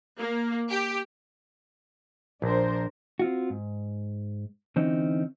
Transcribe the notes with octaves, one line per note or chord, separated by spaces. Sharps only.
A#3
G4
A#1 D4 A#4 C5
C4 F4 F#4
G#2
D3 E3 C4 C#4 D#4